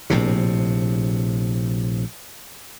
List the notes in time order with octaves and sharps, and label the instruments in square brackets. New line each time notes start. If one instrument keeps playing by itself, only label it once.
[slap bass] A#1 A2 C3